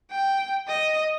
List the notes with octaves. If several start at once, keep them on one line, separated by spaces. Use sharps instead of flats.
G5
D#5